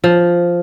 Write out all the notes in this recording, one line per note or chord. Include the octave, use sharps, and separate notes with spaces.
F3